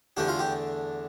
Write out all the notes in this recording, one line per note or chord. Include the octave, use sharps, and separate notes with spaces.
E2 D3 A3 D4 G4
F4
G4